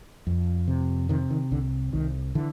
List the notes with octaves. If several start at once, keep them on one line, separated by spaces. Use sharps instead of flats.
F2
C3
C3 D#3
D#3
C2 D3
C2 D#3
D3 E3